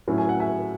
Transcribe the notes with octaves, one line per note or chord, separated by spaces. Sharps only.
A2 F#3 C#4 E4
G#5
F#5
E5 G#5